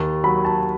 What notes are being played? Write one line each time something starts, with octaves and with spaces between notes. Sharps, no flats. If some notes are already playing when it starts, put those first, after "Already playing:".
Already playing: D#2
F#3 B5
A5